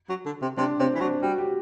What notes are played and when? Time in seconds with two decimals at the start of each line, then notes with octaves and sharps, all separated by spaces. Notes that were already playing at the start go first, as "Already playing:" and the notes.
0.09 F#3
0.26 D3
0.42 C3
0.57 C3 D4
0.79 C3 C4
0.95 E3
1.00 F#3 D4
1.22 G3 F#4
1.38 G4